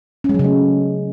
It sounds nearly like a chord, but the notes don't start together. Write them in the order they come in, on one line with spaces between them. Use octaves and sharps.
C#4 G#3 F#3 C#3 A3